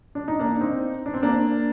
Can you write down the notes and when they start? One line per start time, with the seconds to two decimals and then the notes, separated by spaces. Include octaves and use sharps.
0.15 D4
0.28 D#4
0.39 A#3 D4
0.60 C4 D#4
1.06 D4
1.14 C4
1.23 A#3 D4